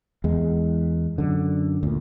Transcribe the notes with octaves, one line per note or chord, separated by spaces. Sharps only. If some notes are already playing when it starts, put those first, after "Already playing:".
E2 G#3
F#2 D3
D2 A#2